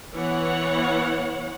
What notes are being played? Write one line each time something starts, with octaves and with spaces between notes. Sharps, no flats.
E3 B3 C#5 F#5